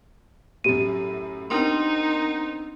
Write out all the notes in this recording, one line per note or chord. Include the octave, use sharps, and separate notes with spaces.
F#2 A2 G4 D#7
B3 C4 D4 D#4 A#4 C6